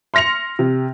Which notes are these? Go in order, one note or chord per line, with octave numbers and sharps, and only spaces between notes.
C6 F6 A#6 C#7 F7
C3